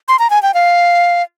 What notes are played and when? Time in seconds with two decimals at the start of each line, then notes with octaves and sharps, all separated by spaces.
0.08 C6
0.19 A#5
0.30 G#5
0.43 G5
0.54 F5